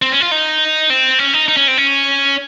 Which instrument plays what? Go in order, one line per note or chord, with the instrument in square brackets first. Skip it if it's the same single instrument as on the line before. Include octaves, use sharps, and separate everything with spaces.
[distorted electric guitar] C4
C#4
F4
D#4
C4
C#4
D#4
D#4
C#4
C4
C#4